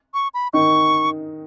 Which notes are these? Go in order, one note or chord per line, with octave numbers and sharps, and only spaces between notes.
C#6
B5
D#3 D#4 C#6